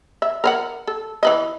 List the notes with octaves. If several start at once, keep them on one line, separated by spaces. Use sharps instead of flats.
E5
A#4 C5 F#5
A4
E3 B4 D#5